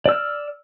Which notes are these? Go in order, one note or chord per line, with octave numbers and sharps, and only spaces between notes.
D5 E6 F6